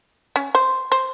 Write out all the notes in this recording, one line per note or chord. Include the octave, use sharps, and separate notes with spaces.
C#4
C5
C5